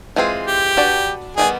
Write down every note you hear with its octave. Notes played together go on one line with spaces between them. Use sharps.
E3 G#3 C4 F4 G#4
G4
D4 F#4 B4 D5
D#3 G3 B3 G#4